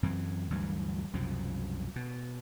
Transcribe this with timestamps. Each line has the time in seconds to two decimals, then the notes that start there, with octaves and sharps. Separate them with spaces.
0.03 F#2 E3 C4
0.50 D2 G2 E3 F#3
1.13 C2 F#2 B2 F3
1.96 B2